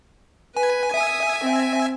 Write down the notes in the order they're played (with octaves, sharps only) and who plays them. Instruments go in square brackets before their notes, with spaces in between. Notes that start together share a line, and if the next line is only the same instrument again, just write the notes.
[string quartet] B4 [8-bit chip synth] G#5
[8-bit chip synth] E5 G#5 [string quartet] D#6
[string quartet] C4